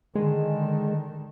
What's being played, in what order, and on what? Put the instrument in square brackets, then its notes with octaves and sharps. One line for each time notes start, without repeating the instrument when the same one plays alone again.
[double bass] D3 D#3 [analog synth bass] G#3